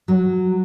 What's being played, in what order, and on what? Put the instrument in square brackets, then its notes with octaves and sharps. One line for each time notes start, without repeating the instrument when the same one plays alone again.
[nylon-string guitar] F#3